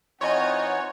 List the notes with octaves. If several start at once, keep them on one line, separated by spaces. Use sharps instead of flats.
E3 C4 D#4 F4 C#5 D#5 F#5 G#5